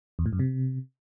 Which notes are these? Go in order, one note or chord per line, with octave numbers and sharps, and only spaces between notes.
E2
A2
F#2
C3